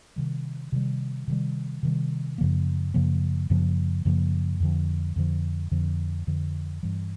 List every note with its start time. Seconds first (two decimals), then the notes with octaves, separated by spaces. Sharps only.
0.16 C3 D#3 G3
0.72 C3 D#3 G3
1.27 C3 D#3 G3
1.83 C3 D#3 G3
2.38 F#2 C#3 F3 A#3
2.94 F#2 C#3 F3 A#3
3.50 F#2 C#3 F3 A#3
4.05 F#2 C#3 F3 A#3
4.60 F2 D3 F3
5.16 F2 D3 F3
5.71 F2 D3 F3
6.27 F2 D3 F3
6.83 G2 E3 G3